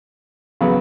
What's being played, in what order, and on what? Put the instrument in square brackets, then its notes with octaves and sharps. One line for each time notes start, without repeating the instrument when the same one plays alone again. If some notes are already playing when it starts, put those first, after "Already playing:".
[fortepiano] C#3 F#3 B3